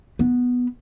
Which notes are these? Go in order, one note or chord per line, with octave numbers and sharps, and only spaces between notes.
B3